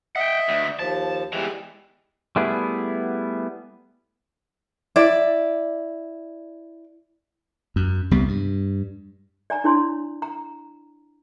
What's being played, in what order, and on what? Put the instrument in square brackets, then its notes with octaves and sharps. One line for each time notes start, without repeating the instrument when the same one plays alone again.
[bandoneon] D#5 E5 [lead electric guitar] F#5 G5
[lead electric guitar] D2
[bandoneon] D#2 F3 [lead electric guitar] A5
[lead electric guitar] E2 E3 [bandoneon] G3 G#3
[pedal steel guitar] G3 A3 B3 E4 G#4
[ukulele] E4 D5
[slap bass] F#2
C2 G3 B3
G2
[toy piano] D5 G#5 A#5
D4 E4 C#5 C6
A#5